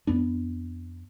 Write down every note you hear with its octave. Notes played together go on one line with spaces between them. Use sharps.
F2 B3 D4